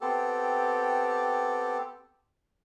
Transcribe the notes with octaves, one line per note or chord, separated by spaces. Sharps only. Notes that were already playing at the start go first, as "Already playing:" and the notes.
B3 C4 G4 A4